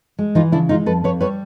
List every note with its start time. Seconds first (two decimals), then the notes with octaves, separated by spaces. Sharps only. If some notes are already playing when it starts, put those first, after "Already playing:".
0.19 G#3
0.35 E3 D#4 F4
0.52 C#3 D4 E4
0.69 G#3 D#4 F4
0.86 F2 A4 B4
1.04 F2 B4 C#5
1.21 G3 B4 C#5